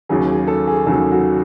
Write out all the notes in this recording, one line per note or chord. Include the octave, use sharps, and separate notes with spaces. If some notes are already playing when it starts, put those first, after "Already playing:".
D#2 C#3 F#3 G#4
G#4
A4
G#4
D#2 C#3 F#3 A4
F#4